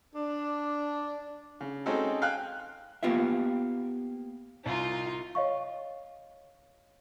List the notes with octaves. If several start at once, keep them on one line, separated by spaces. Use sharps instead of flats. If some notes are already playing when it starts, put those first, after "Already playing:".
D4
C#3
G#3 C4 C#4 D#4 F#4 A4
F5 G5 G#5 F#6
A#3 B3 F4 G4 E5
C2 D#4 F4
C#5 D#5 F5 C#6